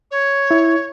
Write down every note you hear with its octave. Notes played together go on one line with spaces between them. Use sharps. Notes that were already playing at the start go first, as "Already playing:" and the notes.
C#5
E4